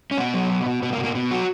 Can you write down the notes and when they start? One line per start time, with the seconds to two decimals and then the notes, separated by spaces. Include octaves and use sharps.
0.11 C#4
0.18 B2 B3
0.34 F#3
0.49 B2
0.66 B2
0.82 B2 B3
0.93 A#3
0.98 B2
1.04 A#3
1.15 B2 B3
1.31 F#3 F#4